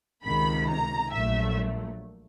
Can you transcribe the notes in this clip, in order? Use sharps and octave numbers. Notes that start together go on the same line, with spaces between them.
C#2 C3 D#3 B5
A#5
A#1 A#2 F#3 A3 E5